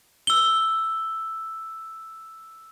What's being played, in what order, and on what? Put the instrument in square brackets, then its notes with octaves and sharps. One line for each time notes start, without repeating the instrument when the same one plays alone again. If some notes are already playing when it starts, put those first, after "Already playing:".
[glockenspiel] E6 G7